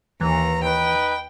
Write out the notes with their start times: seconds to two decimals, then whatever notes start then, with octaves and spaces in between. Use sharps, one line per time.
0.21 D#2 E3 A#5
0.63 D#4 B4 G5